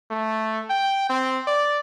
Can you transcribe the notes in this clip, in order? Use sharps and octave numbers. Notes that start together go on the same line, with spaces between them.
A3
G5
C4
D5